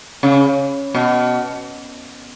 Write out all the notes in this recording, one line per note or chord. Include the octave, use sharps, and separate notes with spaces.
C#3
B2